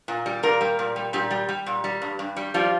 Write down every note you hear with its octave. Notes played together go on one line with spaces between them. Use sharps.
A#2
G3
A#2 A#3 A#4
G3
A#2
G3
A#2 G3 G4
G3
G3
A#2
G3
G2
G2
G3
F3 G3 F4